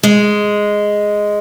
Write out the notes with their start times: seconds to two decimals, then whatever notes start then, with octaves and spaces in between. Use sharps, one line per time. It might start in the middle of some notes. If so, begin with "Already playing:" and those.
0.03 G#3